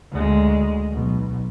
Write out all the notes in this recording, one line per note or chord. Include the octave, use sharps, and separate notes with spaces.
D2 G#3
B1